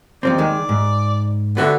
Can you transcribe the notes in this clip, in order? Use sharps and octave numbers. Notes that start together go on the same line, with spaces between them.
D#2 F3 C4 D5
D#3 G#3
G#2
D3 B3 F#4 E5